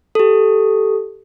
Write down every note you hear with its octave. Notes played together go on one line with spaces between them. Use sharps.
G4 A4